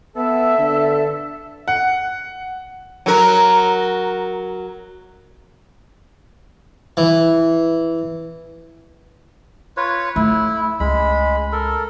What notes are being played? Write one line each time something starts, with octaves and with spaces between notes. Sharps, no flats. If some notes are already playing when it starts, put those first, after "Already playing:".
B3 A4 E5
D3
F#5
F#3 A#4
E3
F4 B4 C#5
A3 E4
C#2 G#3 B5
A4 A#4